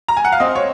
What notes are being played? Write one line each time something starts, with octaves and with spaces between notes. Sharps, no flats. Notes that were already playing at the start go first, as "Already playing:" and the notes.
A#5
G#5
F#5
F5
C4 D#5
C#5